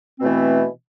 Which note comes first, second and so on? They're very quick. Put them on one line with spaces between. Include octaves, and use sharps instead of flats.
C4 B2 A3 E3